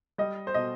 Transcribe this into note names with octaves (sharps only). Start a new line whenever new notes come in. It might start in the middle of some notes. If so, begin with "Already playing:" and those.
G3 D#5
C5
B2 D#5